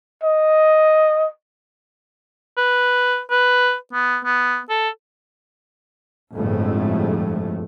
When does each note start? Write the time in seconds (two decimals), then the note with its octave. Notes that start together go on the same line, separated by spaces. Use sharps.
0.24 D#5
2.57 B4
3.31 B4
3.93 B3
4.25 B3
4.69 A4
6.34 G1 F2 A2 G#3 A3